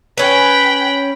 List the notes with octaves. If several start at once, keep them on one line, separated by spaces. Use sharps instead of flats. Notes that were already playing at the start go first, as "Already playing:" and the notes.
C#4 B4 G5 B5